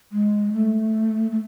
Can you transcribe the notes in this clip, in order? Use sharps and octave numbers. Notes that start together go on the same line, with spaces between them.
G#3
A3
A3